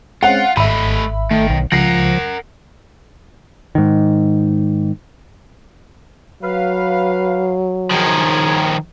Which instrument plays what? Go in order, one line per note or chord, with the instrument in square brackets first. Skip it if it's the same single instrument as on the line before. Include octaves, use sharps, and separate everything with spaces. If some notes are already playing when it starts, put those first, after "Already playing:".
[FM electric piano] G#3 C4 C#4 [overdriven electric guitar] F4 [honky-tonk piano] F#5
[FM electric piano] G#1 E5 [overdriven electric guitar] A3 D#5 [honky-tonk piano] B5
[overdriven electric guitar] D#3 [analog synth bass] A3
[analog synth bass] B1
[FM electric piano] C#2 [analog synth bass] F3 [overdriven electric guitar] A#4 F#5 [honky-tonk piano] A#6 C7
[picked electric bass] G#2 D#3
[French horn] F#3 [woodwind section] B4 F5
[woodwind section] F#2 G#4 [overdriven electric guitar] D#3 F3